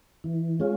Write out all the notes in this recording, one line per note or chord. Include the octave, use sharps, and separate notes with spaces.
E3
G#3 C#4 F4